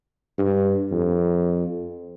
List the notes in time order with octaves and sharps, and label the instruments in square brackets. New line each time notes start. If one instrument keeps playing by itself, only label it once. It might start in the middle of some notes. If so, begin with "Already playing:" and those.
[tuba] G2
F2